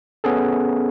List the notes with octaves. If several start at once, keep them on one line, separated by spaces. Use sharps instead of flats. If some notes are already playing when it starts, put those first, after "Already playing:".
B3 C#4 G#4 A4